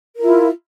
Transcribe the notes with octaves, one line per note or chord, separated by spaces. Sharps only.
E4 F4 A#4